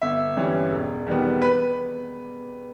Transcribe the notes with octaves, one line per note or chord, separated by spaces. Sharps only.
G1 E5
G2 E3 G3 C#4
E1
E2 D#3 G3 B3
B4